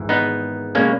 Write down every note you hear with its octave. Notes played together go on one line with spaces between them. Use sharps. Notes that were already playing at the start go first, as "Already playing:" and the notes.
Already playing: G#1 G#2 E3
B3 D#4
B2 G#3 A#3 C#4